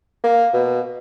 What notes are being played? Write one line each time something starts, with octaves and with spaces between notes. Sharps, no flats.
A#3
B2